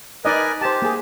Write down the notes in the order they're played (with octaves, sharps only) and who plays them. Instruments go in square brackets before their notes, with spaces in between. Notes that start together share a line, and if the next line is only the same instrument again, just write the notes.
[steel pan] D#4 D5 D#5 [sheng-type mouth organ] A#4 B4 G#5
[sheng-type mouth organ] G4 [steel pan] C5 A5
[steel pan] A#3 G#4